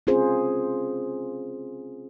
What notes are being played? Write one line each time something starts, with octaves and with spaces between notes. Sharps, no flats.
C4 C#4 F4 G#4 C5